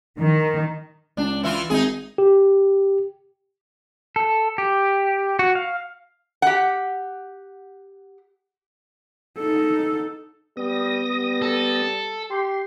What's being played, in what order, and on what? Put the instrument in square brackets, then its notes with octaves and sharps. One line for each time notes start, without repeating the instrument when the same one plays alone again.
[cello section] D#3
[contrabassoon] C#2 [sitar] D4
[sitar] E3 E4 F4
[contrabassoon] G#1 [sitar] D#4 G#4
[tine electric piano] G4
[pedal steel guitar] A4
G4
F#4
F5
[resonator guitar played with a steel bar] G4 F#5
[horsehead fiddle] D#4 A4
[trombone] G3 [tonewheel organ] B3 D#6 A#6
[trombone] G3
[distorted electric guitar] A4
[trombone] G4 [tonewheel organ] C6